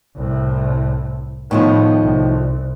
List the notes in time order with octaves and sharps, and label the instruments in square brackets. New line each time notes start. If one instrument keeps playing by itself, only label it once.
[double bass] C2 A2
[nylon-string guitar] A2 D#3 F3 [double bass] B3
[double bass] C2